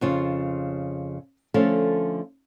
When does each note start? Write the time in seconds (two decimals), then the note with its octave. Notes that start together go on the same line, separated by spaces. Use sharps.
0.01 F2 C#3 F4
1.54 D3 F3 A3 C#4 A4 F5